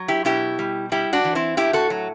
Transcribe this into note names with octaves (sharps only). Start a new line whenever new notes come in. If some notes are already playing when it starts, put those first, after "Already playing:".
Already playing: F#3
E4 G4
B2 E4 G4
G3
G3 E4 G4
D4 F#4
E3
C4 E4
A2 E4 G4
F#4 A4
F#3